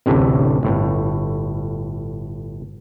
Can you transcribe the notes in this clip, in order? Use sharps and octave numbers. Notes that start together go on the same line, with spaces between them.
A1 D2 A2 C3
G1 A2